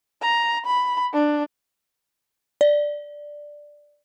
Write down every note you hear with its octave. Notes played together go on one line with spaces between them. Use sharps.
A#5
B5
D4
D5